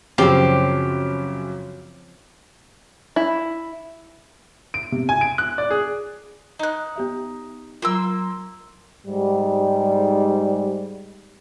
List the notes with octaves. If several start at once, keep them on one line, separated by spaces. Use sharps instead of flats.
F#2 C#3 F3 C4 G4 C7
E4
D7
C3
G#5
D7
F#6
D5
G#4
D#4 D#5 F#6
B3 G4 E5
F#3 A#3 F4 C6 E6
G#2 G3